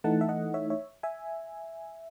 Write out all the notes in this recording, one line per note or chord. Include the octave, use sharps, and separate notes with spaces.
E3 A3 D#4 F#5 A5
E5
D#5 F#5
C#5 E5
C#5 E5
E5 G#5